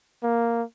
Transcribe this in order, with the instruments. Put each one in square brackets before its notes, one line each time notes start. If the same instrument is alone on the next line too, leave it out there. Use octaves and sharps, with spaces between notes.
[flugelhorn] A#3